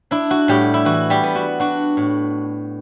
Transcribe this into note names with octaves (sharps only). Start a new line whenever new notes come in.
D4 E4
F#4
A2 G3 G4
E4
E3 F#4
G3 G4
B3
F#4
D4 F#4
A2